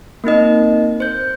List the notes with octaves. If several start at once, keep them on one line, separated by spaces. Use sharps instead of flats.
A#3 C4 D#4 D#5
C5 G6